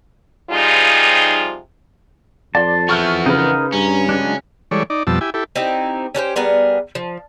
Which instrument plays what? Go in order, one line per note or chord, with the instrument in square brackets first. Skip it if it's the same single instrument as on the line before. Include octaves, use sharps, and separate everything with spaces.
[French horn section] C3 F3 G3 D#4 F4 G#4
[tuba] F2 [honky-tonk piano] D5 [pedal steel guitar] A5 C6
[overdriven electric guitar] E3 B3 [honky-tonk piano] C#6 F6 G6
[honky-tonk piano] C#3 B4 [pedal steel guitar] D#4 A#4
[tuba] G2 [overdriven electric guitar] C#4 [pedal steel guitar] A#5
[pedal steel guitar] F#3 G#3 D4
[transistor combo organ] E3 G3 G#3 A4 C#5 D5
D#4 D5
F2 B2 F3 G3 A5 E6
E4 G4 G#5
E4 G4 A4
[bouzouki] C4 D#4 E4 G4
C#4 D4 G4 C5
G3 B3 G#4 A#4
F3